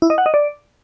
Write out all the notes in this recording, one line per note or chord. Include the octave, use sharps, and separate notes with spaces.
E4
D#5
F#5
D#5
D5